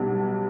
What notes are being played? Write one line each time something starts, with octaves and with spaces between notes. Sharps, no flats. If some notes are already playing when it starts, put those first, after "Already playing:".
Already playing: B1 B2 G3